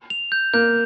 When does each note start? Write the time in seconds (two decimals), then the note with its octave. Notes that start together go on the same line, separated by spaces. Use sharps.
0.10 F7
0.32 G6
0.53 A#3 G6